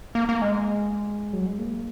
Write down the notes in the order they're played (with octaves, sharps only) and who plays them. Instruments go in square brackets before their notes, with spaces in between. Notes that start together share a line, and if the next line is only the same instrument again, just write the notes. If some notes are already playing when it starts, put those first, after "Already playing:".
[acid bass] A#3
A#3
G#3
F#3
G#3
A#3